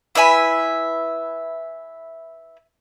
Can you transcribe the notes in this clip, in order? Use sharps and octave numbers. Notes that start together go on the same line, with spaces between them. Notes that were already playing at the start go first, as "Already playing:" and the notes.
E4 B4 E5 G#5